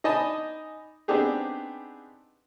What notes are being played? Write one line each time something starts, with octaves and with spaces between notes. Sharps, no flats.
D#4 D5 D#5 G#5 A5 B5
B3 C4 D4 D#4 G4 G#4